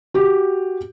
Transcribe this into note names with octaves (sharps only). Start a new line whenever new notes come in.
F#4 G4